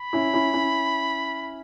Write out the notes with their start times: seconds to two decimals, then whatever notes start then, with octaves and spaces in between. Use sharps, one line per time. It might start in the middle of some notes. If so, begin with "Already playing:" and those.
Already playing: B5
0.13 C#4 E4
0.33 C#4 E4
0.53 C#4 E4